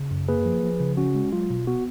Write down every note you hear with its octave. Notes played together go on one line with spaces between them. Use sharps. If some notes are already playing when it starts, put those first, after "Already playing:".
Already playing: C#3
F#2
A#3 G#4 B4
F3
F3
C#3
C#4 F#4
G#3
F#3 F4
B2
B3 F#4